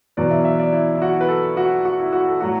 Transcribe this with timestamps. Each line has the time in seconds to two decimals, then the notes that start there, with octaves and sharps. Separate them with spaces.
0.17 E2 B2 F#3 D5
0.31 E5
0.45 E5
0.59 D5
0.73 E4
0.95 E4
1.02 F#4
1.21 B4
1.28 A4
1.57 F#4
1.85 F#4
2.00 E4
2.13 F#4
2.27 A4
2.41 A2 F#3 F#4